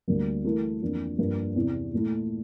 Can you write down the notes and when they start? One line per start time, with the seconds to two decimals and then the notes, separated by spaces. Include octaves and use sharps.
0.08 D2 D3 G3 A#3
0.44 E3 A3 E4 A#4
0.82 F2 E3 A#3 D4
1.18 G2 F3 A#3
1.56 E2 C3 E3
1.93 A#2 A3 E4